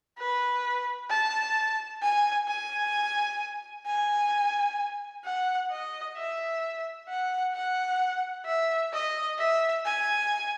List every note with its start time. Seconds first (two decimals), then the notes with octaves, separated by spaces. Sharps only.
0.19 B4
1.10 A5
2.02 G#5
2.48 G#5
3.86 G#5
5.25 F#5
5.71 D#5
6.17 E5
7.09 F#5
7.54 F#5
8.46 E5
8.93 D#5
9.39 E5
9.85 G#5